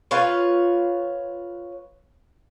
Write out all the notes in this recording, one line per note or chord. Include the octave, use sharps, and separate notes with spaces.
F4 B4 C#5